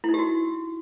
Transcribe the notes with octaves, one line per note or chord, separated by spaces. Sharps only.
D#4 E4 F#4 G4